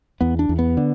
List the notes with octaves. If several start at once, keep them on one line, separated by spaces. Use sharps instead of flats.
E2 B3
D4
E2
B3
D3